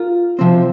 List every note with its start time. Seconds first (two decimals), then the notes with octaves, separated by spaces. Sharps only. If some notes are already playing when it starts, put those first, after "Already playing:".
Already playing: F4 A#4
0.39 C3 F3 C4